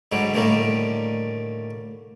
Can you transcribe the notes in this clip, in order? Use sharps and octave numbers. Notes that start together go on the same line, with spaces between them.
G#2 D3 F#3 G3
A2 D3 D#3 G3 A3 A#3